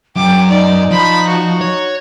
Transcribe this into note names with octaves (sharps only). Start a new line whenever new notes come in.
F#2 G5 D6
D#4 D5
F3 B5
F#4
C#5